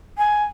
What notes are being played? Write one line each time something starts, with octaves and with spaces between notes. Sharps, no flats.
G#5